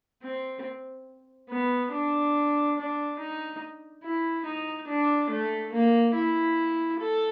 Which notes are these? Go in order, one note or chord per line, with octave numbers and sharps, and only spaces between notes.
C4
B3
D4
D4
D#4
E4
D#4
D4
A3
A#3
E4
A4